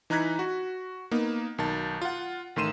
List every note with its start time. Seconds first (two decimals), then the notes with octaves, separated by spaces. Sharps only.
0.10 E3 D#4 A#5 F#6 G#6 B6
0.39 F#4
1.11 A#3 B3 D#4
1.58 B1 D#3 A5 A6
2.02 F4 F#5
2.56 A1 D#3 A3 C6 D#7 E7